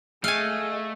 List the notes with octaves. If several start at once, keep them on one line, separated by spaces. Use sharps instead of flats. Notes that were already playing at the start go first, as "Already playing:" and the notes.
A3 G#4 D#5 F5 G#5